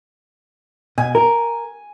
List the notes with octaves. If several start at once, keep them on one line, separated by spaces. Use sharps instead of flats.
B2 G#5
A#4